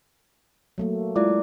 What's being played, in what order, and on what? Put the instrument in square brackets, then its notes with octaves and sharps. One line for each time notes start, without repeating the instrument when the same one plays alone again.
[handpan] F#3 A3 A#3
[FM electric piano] G#3 F4 [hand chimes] E4 D5 D6